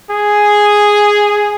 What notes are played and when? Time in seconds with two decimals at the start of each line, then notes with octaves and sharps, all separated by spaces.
0.11 G#4